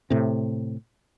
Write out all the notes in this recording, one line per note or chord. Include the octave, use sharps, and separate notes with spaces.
A2 C3